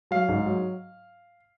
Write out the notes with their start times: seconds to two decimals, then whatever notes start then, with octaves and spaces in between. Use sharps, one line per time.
0.11 F#3 F5
0.29 G#2
0.46 F#3